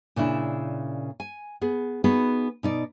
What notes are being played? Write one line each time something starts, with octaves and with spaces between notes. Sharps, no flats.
A#2 C#3 D4 E4
G#5
B3 G#4
B3 D#4 F#4 G#4 B4
B2 D#4 D5